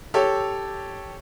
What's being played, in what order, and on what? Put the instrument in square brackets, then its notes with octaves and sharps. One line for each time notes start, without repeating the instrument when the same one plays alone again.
[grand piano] G4 A4 C#5